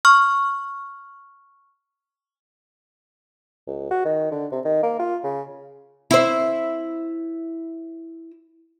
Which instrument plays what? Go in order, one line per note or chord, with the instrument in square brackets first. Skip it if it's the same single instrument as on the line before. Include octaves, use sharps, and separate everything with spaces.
[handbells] C#6 F6
[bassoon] C#2
F#4
D#3
D3
C3
D#3
A#3
F4
C#3
[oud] E4 C5